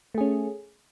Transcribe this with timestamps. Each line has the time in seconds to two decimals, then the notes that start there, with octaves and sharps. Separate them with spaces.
0.15 A3
0.18 G#4
0.21 C#4